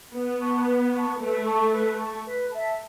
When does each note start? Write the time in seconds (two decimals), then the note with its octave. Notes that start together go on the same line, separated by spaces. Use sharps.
0.13 B3 B4
0.39 A5 C#6
0.66 B4
0.92 A5 C#6
1.18 A3 B4
1.46 A5 C#6
1.72 B4
1.98 A5 C#6
2.25 B4
2.51 E5 A5